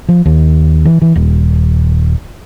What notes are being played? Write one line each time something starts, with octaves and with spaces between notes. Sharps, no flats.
F3
D#2
E3
E3
D#1